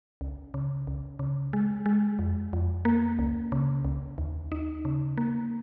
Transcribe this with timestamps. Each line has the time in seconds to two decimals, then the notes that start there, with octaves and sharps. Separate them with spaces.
0.21 C#2
0.54 C#3
0.87 C#2
1.19 C#3
1.53 G#3
1.86 G#3
2.19 F2
2.53 F2
2.85 A#3
3.19 C#2
3.52 C#3
3.85 C#2
4.18 D#2
4.52 D#4
4.85 C#3
5.17 A#3